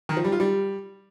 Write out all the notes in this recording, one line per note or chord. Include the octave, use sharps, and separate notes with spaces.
D#3
F3
G3
F4
G3